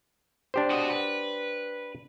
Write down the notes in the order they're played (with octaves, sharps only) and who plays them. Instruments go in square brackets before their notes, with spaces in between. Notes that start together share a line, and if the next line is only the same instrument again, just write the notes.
[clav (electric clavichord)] D4 G4 C5
[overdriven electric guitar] F#4 D#5
B4